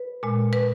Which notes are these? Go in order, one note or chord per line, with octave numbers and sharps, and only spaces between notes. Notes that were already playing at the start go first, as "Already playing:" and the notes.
Already playing: B4
A#2 G#3
B4